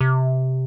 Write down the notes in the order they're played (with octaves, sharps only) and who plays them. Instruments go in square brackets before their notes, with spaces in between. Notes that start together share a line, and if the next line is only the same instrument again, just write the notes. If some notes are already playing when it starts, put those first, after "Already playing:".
[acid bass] C3